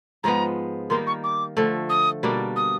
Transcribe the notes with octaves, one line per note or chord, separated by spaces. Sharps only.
G#2 F3 G#3 B3 A#5
D#3 G3 A#3 D#4 C6
C#6
D6
D3 F3 A3
D#6
B2 G3 A#3 D4
D#6